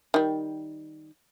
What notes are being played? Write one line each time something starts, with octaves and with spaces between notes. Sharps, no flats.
D#3 G3